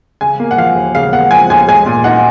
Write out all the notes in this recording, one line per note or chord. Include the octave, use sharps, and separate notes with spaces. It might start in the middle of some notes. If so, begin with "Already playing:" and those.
C#3 G#5
A#3
F#5
F3 F5
D#2
C#3 F5
A#3 F#5
F3 G#5
D#2 G#5
G#3 G#5
A#2
D#4 F#5